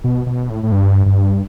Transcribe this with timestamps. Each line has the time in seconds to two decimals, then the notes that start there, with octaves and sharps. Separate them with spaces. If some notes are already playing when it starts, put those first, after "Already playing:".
0.04 B2
0.26 B2
0.50 A2
0.63 A2
0.72 G2
1.06 G2